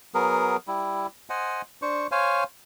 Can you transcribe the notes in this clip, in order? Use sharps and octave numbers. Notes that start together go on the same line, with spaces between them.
F#3 B3 G#4 A#4
G3 E4
C5 D#5 F#5 G#5
D4 C5 C#6
C5 C#5 F5 G#5